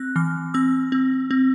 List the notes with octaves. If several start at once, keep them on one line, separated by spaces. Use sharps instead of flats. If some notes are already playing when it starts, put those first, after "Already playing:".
Already playing: C4 F#6
E3 F6
C4 E6
C4
C4